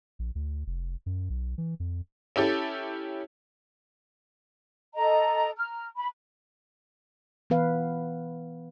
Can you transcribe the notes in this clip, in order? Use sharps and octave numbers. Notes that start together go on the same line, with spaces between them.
A#1
D2
F1
F#2
B1
E3
F2
C#4 E4 G4 A4
A4 D#5 A#5
A#5 F6
B5
E3 B3 B4 F5